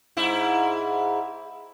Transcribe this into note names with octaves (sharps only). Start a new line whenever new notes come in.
G#2 E4